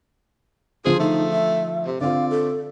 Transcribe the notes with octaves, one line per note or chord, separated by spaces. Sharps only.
D3 F3 F4 G#4 C5
A3 D#4
E5
C3
D3 C4 F4 D5 F5
A4